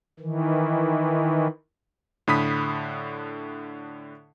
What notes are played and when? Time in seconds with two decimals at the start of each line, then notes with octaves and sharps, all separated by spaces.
0.20 D#3 E3
2.27 A2 D3 B5 D#6 B6